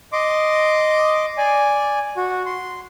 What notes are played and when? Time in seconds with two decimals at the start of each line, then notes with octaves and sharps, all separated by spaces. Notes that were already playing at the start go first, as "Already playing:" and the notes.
0.13 D#5 C6 D6
1.38 D5 G#5
2.17 F#4
2.46 C6